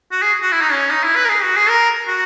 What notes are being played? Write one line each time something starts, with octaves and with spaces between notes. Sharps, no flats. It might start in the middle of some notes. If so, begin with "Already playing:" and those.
F#4
G#4
F#4
E4
D#4
C#4
D#4
E4
B4
A#4
G#4
F#4
G#4
A#4
F#4